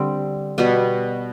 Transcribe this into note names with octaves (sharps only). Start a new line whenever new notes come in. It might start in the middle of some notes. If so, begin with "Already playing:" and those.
Already playing: D3 G3 C4
B2 G3 B3